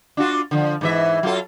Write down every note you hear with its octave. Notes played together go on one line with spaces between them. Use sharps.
D4 F4 F#4
D3 F3
G#2 E3 E5
F#3 F4 A4